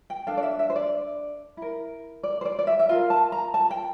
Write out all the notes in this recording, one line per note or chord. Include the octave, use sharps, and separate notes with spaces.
G5
D4 A4 F5
D5
E5
E5
C5
D5
E4 A#4
D5
C5
D5
D5
E5
E5
F4 A#4 F5
A5
A#5
A5
G5